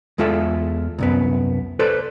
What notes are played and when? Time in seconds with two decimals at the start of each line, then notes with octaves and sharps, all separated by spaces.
0.18 E2 G#3 F4 A4 E5
0.98 C2 F#2 B3
1.79 A4 B4 C5 D5